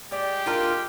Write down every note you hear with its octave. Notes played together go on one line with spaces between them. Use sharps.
G#3 G4 D5
D4 F4 A#4